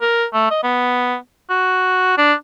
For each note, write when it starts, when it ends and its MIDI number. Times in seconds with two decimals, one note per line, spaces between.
0.01 0.25 70
0.33 0.50 57
0.51 0.60 75
0.63 1.15 59
1.50 2.15 66
2.17 2.33 62